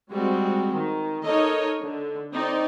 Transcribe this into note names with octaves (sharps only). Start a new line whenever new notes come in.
G3 G#3 C4 F#4
D#3
D#4 A4 A#4 C#5 D#5
D3
C4 D#4 D5